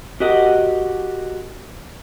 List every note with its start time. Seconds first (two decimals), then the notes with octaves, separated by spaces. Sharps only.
0.20 F#4 G4 A#4 D#5 F#5